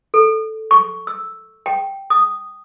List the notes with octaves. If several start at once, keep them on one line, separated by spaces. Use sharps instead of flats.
A4
C#6
E6
G5
D#6